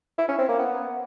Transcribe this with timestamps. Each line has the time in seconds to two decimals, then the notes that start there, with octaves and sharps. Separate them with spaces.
0.18 E4
0.29 C#4
0.39 C4
0.49 A#3
0.59 B3